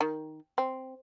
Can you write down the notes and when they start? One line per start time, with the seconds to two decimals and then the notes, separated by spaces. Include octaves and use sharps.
0.01 D#3
0.58 C4